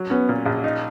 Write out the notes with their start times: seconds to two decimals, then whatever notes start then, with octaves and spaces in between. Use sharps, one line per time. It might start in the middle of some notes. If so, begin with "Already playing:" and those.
Already playing: F#3
0.10 B3 C#4
0.29 A#2
0.45 A#1
0.64 D#4